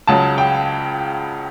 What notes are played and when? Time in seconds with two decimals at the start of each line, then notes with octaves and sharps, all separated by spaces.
0.07 C#2 C#3 F#3 A5
0.38 G5